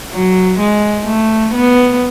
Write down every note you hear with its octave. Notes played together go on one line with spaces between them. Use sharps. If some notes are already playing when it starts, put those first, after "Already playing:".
F#3
G#3
A3
B3